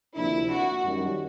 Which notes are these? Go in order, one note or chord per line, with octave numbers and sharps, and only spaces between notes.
D2 C3 F3 A#3 D4 E4
F#4
F#2 D#3 G3